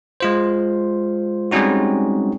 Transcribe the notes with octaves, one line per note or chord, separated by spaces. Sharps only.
G#3 F4 C5
G3 G#3 C4 C#4 D#4 F#4